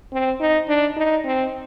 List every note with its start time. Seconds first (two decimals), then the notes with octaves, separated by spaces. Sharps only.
0.12 C4
0.40 D#4
0.68 D4
0.97 D#4
1.25 C4